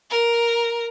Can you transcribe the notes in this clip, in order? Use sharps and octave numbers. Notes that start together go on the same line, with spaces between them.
A#4